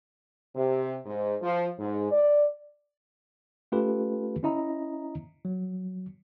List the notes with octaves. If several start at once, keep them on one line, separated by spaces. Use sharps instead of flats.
C3
G#2
F3
G#2
D5
A3 C#4 F4 G4 A4 B4
C#4 E4 D#5 A#5
F#3